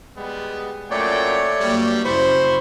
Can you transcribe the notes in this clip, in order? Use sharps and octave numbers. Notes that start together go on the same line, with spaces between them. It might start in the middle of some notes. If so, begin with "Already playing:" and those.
G3 G#3 B3
F#2 A#2 A3 C#5 D5 G5
G2 F#3 G3 A#3
F#2 C#3 E4 C5 B5 C#6